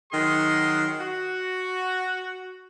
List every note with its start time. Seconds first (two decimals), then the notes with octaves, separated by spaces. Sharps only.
0.13 D#3 F#3 G#4 F#5 C6
0.99 F#4